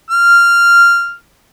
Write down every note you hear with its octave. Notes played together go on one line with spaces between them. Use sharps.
F6